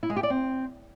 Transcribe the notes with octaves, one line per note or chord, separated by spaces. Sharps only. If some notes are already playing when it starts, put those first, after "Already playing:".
E4
G#3
G4
D5
C4